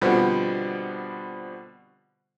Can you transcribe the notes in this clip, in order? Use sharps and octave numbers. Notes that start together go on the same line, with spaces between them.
B2 D3 F3 G3 B3 C4